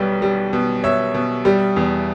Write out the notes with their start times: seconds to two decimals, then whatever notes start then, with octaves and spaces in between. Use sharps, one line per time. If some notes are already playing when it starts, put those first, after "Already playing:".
Already playing: B1 B2 G3 B4
0.22 G3
0.53 B2
0.83 B2 C#5 E5
1.14 B2
1.45 G3
1.76 E2